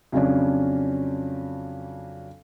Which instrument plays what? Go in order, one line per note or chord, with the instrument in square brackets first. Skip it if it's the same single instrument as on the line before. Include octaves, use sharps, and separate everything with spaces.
[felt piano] F2 C#3 F#3 C#4 D4